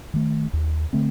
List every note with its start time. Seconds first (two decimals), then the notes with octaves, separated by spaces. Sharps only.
0.14 D#3 A3
0.53 D#2
0.93 D3 A3 C4